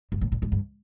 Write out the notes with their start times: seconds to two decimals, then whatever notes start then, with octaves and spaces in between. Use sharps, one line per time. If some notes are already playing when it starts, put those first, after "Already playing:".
0.12 G2
0.21 A2
0.32 A#2
0.42 G#2
0.52 G2